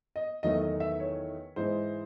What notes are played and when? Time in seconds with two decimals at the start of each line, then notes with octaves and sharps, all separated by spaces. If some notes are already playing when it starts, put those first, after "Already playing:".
0.16 D#5
0.43 E2 D#3 F#3 A3 D#5
0.61 D#5
0.80 E5
1.00 C#5
1.56 G#2 E3 G#3 C5